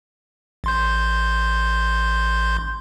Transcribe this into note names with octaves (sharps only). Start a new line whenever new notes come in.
A1 C6 G6